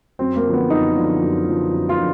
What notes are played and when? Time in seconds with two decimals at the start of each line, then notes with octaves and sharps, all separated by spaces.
0.19 F#2 C4
0.36 A#3
0.45 D3 F3
0.53 B3
0.70 F#2 D#4
0.96 D3 F3
1.21 F#2
1.47 D3 F3
1.73 F#2
1.89 F4
1.98 D3 F3